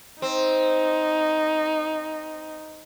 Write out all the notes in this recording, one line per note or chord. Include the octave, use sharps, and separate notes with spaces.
C4 D#4